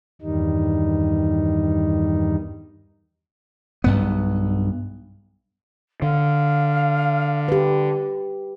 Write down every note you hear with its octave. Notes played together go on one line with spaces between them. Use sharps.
E2 G2 D#3 G3 D#4
B1 G2 B3
D3 F5
G4 B4